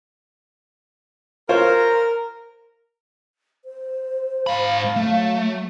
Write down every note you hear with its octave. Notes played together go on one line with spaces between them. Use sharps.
F4 A#4 C5 C#5
C5
G#2 F5 B5
F#3 A3